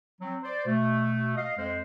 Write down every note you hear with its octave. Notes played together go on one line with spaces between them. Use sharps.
F#3 C4
C5 D5
B2 A3
D#5 F5
F2 G#3 C5